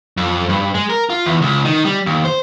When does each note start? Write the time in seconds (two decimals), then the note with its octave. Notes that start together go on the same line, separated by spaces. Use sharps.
0.17 F2
0.49 G2
0.74 G#3
0.90 A#4
1.10 F4
1.26 E2
1.41 C#2
1.65 D#3
1.85 G3
2.06 D#2
2.25 C5